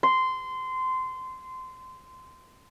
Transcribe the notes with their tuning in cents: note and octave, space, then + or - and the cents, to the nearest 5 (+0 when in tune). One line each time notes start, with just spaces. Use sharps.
C6 -20